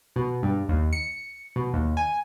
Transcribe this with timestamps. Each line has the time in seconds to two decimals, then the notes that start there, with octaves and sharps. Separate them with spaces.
0.16 B2
0.43 G2
0.69 D#2
0.93 C#7
1.56 B2
1.73 D#2
1.97 G#5